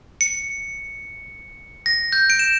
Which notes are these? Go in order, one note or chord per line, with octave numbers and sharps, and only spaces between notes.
C#7
A#6
G6
D7
E7